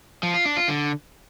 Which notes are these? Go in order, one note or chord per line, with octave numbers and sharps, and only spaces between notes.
F3
F4
D4
F4
D3